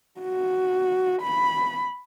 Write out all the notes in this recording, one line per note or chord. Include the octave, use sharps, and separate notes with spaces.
F#4
B5